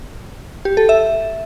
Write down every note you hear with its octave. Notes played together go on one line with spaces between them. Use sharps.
G4
A4
E5